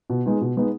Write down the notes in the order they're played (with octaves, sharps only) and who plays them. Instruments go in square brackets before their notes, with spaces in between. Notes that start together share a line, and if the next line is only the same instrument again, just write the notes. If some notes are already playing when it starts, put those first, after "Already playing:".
[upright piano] B2
G#3 B3 D#4
B2
G#3 B3 D#4